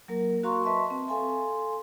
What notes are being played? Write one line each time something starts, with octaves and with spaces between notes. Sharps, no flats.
F#3 A#3 A#4
F#4 F5 A#5 C6 C#6
B4 D#5 E5 A5 C6 C#6
C4
A4 F5 G#5 C6